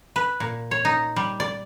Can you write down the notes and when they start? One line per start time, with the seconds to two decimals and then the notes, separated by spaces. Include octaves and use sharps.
0.16 B4
0.40 A#2
0.71 C#5
0.85 D#4
1.16 G3
1.40 D5